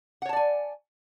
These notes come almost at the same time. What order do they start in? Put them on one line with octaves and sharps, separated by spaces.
F#5 C#5 A5 D5 G#5